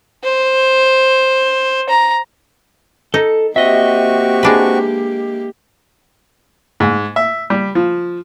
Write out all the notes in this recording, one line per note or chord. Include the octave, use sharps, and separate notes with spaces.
C5
A#5
D#4 A4
A#3 C4 F#4 G4 D#5 E5 C#6
G#3 D4 B4
G#2
E5
G3
F3